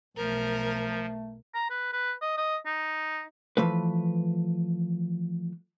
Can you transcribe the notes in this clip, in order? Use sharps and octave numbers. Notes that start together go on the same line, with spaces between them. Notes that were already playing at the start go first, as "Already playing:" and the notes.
B1 F3 A3 A#4
A#5
B4
B4
D#5
D#5
D#4
E3 F3 A3 B4